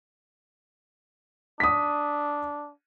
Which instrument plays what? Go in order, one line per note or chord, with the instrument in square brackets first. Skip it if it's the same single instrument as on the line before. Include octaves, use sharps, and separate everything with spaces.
[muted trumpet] D4 [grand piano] D#6 B6